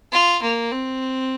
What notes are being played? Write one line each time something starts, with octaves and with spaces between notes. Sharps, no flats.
F4
A#3
C4